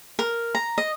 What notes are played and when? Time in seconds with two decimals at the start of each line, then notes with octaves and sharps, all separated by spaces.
0.19 A#4
0.55 A#5
0.78 D#5